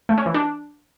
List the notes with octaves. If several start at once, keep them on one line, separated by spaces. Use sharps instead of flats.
A3
C#4
E3
D4